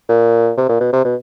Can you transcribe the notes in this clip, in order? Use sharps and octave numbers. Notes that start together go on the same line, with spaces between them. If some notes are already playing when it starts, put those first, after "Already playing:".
A#2
C3
A#2
B2
C3
B2